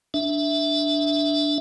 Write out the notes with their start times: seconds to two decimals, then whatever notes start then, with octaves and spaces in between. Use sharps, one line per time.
0.14 D4 E5